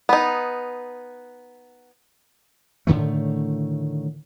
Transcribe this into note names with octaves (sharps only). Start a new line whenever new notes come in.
B3 D#4
A2 D3 D#3 A3